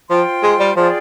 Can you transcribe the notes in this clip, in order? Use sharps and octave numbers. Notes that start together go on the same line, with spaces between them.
F3 F4 C5 G5 C6
G#3
G3
F3 F4 G#4 D5 G5